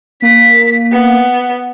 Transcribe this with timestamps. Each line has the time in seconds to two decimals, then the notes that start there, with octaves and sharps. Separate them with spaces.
0.22 A#3 B6
0.92 B3